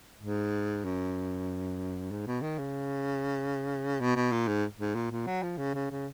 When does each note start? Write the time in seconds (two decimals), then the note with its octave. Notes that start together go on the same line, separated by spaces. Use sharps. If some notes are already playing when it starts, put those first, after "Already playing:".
0.21 G#2
0.85 F#2
2.11 G#2
2.27 B2
2.42 D#3
2.58 C#3
4.00 B2
4.16 B2
4.32 A#2
4.48 G#2
4.79 G#2
4.95 A#2
5.11 A#2
5.27 F#3
5.43 F3
5.58 C#3
5.74 C#3
5.90 C#3